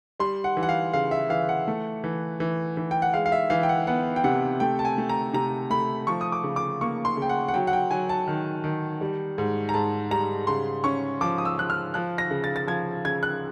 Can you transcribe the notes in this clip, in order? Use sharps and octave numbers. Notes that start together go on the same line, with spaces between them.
G3 C6
F#5
E3
F#5
F5
C#3 F5
E5
E3 F5
F#5
A3
E3
E3
E3
G5
F#5
G#3 F5
F5
E5
E3 F5
G5
F#5
B3 F#5
G5
C3 F#5
A3 G5
A5
G#5
A3
A#5
C3 A#5
A3 B5
F3 C#6
D#6
D6
C#3
D6
A#3 C#6
C6
C#3 G5
F#5
F#5
F#3 G5
F#5
G5
F#3 G#5
A5
D#3
D#3
G3
G#2
A#5
G#2 A5
G3 A#5
C#3 C6
C#4 C#6
F3 D6
D#6
E6
F3 F#6
F6
F3 F#6
A#6
C#3
A6
A6
F3 G#6
C#3 G#6
F#6